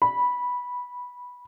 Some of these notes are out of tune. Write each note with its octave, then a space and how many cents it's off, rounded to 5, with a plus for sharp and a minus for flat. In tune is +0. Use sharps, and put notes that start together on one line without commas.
B5 -10